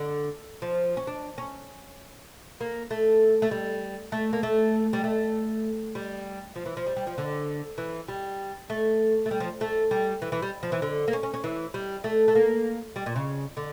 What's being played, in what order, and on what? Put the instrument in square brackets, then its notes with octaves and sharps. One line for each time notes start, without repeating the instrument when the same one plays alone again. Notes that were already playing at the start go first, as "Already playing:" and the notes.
Already playing: [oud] D3
F3
C#4
D4
C#4
A#3
A3
A3
G3
A3
A#3
A3
G3
A3
G3
F3
E3
F3
G3
G3
F3
D3
E3
G3
A3
A3
G3
F3
A3
G3
E3
E3
G3
F3
E3
D3
A#3
C#4
C#4
C#4
E3
G3
A3
A3
A#3
G3
A#2
C#3
D3